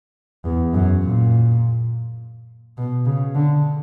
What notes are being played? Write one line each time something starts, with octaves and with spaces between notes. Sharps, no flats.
E2
F#2
A#2
B2
C#3
D3